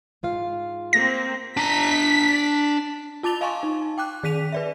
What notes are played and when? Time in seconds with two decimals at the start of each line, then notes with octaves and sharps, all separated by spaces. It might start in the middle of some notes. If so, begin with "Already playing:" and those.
0.23 G#2 F4 F5
0.93 A#3 C4 A#6
1.57 D4 A#5 B6
3.23 F4 A5 D6 A6 F7 G7
3.41 D#5 F5 G#5 A5 C6 C#6
3.63 D#4
3.98 G5 D6 F#6
4.23 D#3 G#4 B6 D#7 F7
4.52 B4 D5 E5